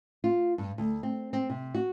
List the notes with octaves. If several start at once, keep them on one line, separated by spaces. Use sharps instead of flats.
F4
G2
D2
C4
C4
C3
F#4